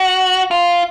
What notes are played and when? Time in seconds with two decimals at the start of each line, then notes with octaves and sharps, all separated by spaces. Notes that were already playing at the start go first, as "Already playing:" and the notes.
Already playing: F#4
0.51 F4